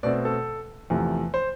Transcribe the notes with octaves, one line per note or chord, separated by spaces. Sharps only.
B2 A3 C4 D5
A4
E2 C3 F3 A3
C5